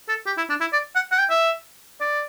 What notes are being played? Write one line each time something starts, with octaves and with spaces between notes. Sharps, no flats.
A4
G4
E4
D4
E4
D5
F#5
F#5
G5
E5
D5